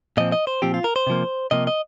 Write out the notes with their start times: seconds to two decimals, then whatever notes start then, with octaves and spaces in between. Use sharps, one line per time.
0.17 A#2 F3 C4 D#5
0.32 D#5
0.47 C5
0.62 A#2 F3 C4 G4
0.74 F4
0.84 A#4
0.96 C5
1.07 C3 F3 A#3
1.51 C3 F3 A#3 D#5
1.67 D#5